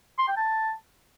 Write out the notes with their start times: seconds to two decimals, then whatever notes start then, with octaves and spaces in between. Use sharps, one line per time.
0.18 C6
0.27 G5
0.36 A5